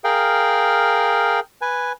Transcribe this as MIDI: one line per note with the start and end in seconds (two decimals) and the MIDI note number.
0.04 1.40 68
0.04 1.40 70
0.04 1.40 77
0.04 1.40 79
1.61 1.92 71
1.61 1.92 80